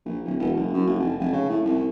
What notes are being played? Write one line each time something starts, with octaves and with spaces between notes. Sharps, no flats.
A#1
D1
E1
F#1
F#2
F#1
F1
F1
C#3
A2
C2